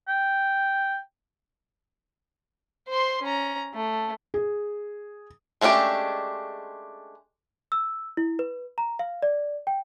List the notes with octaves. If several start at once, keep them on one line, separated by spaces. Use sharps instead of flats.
G5
C5 C6
C#4 A#5
A3
G#4
G#3 A3 C#4 D4 G4
E6
E4
B4
A#5
F5
D5
G5